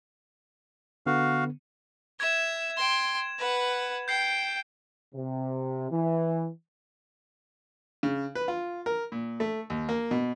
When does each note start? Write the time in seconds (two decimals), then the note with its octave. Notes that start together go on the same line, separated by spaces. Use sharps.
1.06 D3 B3 F#4 F5
2.20 E5 G#6 E7
2.76 G5 C6
3.39 B4 F#5
4.08 G5 G6 C7
5.14 C3
5.90 E3
8.03 C#3
8.35 B4
8.48 F4
8.86 A#4
9.12 A#2
9.40 A3
9.70 D#2
9.89 A#3
10.11 B2